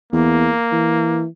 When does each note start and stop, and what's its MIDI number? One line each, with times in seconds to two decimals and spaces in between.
0.13 0.51 40
0.13 1.25 58
0.72 1.26 52